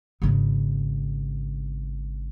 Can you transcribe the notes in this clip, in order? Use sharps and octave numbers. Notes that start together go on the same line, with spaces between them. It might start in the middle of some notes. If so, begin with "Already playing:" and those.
G#1 C#3